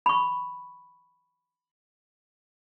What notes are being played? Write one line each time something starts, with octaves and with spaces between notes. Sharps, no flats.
B5 C#6